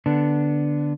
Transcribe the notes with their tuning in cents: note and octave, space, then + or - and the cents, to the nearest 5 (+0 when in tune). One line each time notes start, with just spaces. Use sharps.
D3 +0 B3 -5 D4 +0